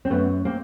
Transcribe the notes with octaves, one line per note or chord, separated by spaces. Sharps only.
C4
F#2 A3 B3
A#3 C4